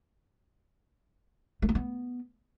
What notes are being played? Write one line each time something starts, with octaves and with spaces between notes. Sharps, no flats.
A3
A#3
B3